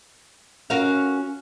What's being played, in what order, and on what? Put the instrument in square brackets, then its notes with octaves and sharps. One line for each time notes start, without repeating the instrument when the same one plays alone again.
[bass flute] C#4 [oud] F#4 A#4 F5